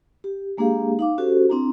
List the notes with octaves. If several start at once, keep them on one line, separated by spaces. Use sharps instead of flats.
G4
G#3 A#3 D4 G4 G#4 F5
D#4 F5 D6
C#4 F#4 G4 A4 C5
C4 D4 E4 A#5